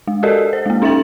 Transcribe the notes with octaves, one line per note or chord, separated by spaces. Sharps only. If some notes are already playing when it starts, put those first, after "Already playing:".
G#3
F#4 G4 A4 A#4 D5 D#5
C5
G#3 A#3
C#4 D#4 E5 G5 A6 F#7